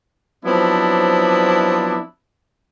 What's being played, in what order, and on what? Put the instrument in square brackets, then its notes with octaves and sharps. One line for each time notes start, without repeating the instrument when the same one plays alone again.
[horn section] F3 F#3 B3 C4 D4 E4